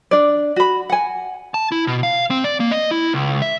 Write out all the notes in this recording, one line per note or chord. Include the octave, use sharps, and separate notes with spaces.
D4 D5
F#4 B5
F#5 G#5
A5
E4
B2
F5
C4
D5
A#3
D#5
E4
C#2
E5